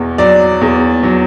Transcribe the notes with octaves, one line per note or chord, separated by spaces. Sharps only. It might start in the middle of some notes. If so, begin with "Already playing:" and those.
Already playing: E2 B2
F#3 D5
E2
F#3